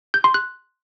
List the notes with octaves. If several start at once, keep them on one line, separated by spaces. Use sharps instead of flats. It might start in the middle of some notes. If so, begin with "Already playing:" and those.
G6
C6
F#6